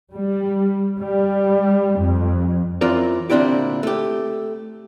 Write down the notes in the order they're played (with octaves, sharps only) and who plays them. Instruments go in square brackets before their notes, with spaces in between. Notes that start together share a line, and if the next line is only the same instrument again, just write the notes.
[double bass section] G3
G3
F2
[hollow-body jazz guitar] F#2 E3 C4 F4 A#4 D5
D2 A#2 C4 D4 E4 G4
A3 G4